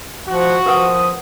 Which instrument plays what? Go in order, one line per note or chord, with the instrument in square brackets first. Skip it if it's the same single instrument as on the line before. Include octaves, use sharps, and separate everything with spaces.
[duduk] F3 [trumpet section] F#4
[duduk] F3 [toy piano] A#4 B4 F#5 [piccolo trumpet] D#6